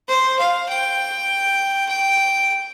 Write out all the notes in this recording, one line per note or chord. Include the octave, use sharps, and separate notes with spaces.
C5
F5
G5
G5